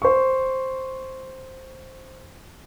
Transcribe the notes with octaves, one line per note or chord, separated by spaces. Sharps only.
C5 C#6